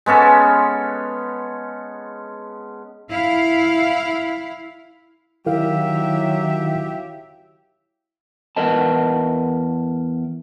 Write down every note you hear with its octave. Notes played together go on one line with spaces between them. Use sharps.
G#3 B3 C#4 A4
E4 F5
D#3 F#3 E4 G4 E5 F5
E2 A#4 B4 D#5 A5